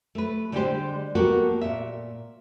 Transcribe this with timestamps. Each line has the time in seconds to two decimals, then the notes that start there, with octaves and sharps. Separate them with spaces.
0.15 A3 B4
0.52 D3 G3 G#3 D4 G4 C5
1.15 A#3 B3 F#4 G4 A4
1.61 A#2 E5